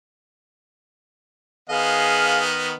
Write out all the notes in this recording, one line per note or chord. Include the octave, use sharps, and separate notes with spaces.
D#3 B3 G#4 D#5 F5